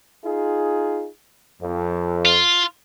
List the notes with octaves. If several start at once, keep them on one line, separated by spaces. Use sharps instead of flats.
D#4 F4 G#4
F2
F4